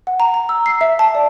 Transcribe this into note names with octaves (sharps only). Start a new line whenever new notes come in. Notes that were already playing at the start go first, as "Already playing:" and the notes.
F#5
A#5
A#5
E6
C7
E5
A5
D5